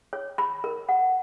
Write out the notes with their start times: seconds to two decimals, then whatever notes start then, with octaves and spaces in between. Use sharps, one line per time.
0.13 C#5
0.38 B5
0.64 A#4
0.89 F#5